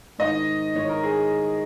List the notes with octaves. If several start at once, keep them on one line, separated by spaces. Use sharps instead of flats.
G#2 D#3 D#5
G#2 D#3 C#5
A#4
G#4